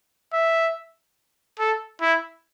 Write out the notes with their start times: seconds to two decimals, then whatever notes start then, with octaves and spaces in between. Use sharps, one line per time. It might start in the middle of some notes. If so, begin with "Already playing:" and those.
0.33 E5
1.59 A4
2.01 E4